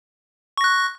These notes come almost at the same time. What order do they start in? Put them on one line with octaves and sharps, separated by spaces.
C#6 A#6 F#6